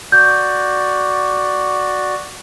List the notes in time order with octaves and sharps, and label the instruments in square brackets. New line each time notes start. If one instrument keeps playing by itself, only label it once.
[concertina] F#4 D5 [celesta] G6